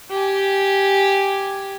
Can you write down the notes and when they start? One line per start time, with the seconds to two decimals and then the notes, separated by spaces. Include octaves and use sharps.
0.10 G4 G#5